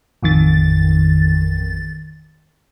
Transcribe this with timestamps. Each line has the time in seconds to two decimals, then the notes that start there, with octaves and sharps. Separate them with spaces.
0.23 A1 F2 D#3 A6